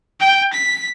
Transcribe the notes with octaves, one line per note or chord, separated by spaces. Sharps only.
G5
B6